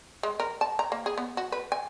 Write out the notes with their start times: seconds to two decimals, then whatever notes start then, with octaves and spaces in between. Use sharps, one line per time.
0.23 G#3
0.40 A#4
0.61 A5
0.79 A#5
0.92 A#3
1.06 G#4
1.18 B3
1.37 F#4
1.52 B4
1.72 G#5